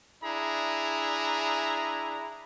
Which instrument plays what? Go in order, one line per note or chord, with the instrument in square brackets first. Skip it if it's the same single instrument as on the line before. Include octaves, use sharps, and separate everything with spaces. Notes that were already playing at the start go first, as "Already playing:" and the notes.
[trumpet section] D4 E4 G#4 A#5